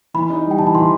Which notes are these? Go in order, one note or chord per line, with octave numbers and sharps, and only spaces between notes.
E3 B5
D#4
G3
G5
E3 A5
B5
E3 C6